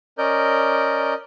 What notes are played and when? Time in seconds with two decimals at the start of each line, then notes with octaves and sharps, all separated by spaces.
0.18 C#4 A#4 D5 D#5 G6